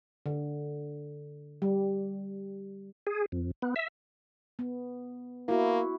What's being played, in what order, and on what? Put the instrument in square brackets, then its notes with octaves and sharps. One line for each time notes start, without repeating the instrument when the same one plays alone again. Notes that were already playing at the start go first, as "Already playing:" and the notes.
[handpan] D3
G3
[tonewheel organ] G#4
F2
B3
E5
[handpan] B3
[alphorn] A#3 [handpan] E4 F#4